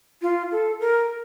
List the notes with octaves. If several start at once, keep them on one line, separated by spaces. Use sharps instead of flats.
F4
A4
A#4